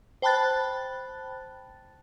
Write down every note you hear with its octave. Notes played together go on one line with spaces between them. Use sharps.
C5 G5 A5 B5 F#6 A6